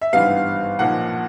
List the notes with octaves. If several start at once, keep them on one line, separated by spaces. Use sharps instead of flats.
E5
G#1 G2 E3 G3 B3 F5
B1 A#2 F3 F#5